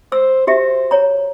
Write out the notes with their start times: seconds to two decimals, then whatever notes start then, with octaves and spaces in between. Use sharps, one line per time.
0.12 C5 E6
0.47 F#4 G4 C5 E5
0.91 C#5 A#5